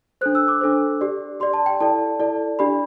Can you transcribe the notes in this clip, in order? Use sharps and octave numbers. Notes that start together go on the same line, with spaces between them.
D4 A4 C5 F#6
E6
D6
D4 A4 C5
G4 D5
G4 D5 C6
A5
G5
E4 A4 D5 A5
E4 A4 D5
D4 G4 D5 B5